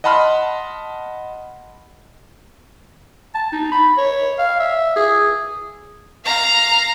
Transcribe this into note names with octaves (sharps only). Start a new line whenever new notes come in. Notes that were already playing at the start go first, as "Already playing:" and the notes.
D#5 F#5 A5 B5 C6 F6
A5
D#4
B5
C#5
F5
E5
G#4
F5 A#5